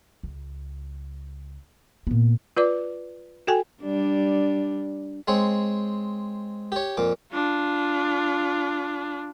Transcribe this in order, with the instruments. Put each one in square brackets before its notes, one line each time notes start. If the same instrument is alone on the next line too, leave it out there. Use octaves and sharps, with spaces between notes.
[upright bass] C#2
A#2 B3
[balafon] F4 B4 D5 D6
F#4 A4 G5 G#5
[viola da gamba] G3 D4
[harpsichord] G#3 C4 C#5
G4 C#5
F2 A#2 D6
[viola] D4 F4